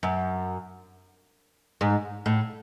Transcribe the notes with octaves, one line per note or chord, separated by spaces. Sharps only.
F#2
G#2
A2